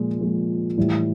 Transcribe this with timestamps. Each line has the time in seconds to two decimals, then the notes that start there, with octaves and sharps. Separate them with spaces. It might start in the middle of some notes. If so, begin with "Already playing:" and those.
Already playing: A#2 F3 G#3
0.19 A#2 F3 G#3
0.77 A2 E3 G3